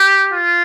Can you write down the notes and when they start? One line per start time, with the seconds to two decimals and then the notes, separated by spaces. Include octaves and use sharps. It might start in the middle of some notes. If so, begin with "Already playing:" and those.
Already playing: G4
0.33 F4